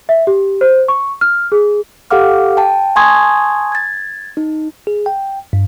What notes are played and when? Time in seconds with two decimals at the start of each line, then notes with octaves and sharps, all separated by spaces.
0.09 E5
0.27 G4
0.61 C5
0.88 C#6
1.21 F6
1.52 G#4
2.11 G4 A4 F5 F#5 D6 F6
2.57 G5 A5
2.96 G#5 A5 C6 C#6 D#6 G#6
3.72 G#6 A6
4.37 D#4
4.87 G#4
5.06 G5
5.53 G2